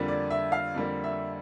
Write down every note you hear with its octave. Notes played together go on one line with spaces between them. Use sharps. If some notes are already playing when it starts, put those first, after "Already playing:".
Already playing: F2 D3 G3 A#3
D5
E5
F5
F2 D3 G3 A#3
E5